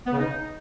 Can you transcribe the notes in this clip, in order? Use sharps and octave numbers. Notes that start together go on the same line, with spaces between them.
B3
C#3
D#4